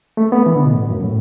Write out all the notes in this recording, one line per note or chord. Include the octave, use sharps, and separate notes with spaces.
A3
B3
E3
D3
B2
A2
F#2
A2